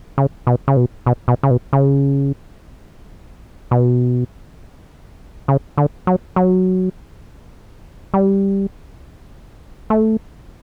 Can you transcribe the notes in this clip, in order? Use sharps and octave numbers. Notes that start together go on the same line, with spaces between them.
C#3
B2
C#3
B2
B2
B2
C#3
B2
C#3
B2
C#3
D3
F#3
F#3
G3
A3